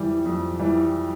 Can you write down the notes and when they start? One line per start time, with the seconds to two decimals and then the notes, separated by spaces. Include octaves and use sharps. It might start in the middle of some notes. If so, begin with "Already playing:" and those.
Already playing: F2 E3 G3
0.25 F2
0.59 E3 G3